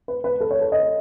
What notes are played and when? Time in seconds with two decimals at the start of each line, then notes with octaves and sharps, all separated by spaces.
0.08 B4
0.24 B4
0.41 A4
0.51 C#5
0.61 A4
0.72 D#5